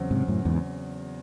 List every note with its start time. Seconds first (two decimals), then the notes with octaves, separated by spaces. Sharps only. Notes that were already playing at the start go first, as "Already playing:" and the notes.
Already playing: E2 C#3 F#3 C4 F#4
0.11 G#2 C3
0.28 F#2 A2
0.45 E2 G#2